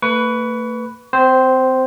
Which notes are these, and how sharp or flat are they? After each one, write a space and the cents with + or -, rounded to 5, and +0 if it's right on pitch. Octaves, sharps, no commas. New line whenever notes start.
A3 +40 B4 +0 C#6 +30
C4 -25 C5 +0